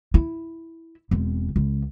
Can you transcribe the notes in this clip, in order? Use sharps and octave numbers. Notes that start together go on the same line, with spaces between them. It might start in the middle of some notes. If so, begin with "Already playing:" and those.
E4
E1 C4
C#2